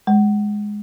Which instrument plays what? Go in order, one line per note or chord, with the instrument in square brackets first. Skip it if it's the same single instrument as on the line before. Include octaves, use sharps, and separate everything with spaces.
[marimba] G#3